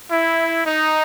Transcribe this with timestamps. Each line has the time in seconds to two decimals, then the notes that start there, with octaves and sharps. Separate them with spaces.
0.11 E4
0.65 D#4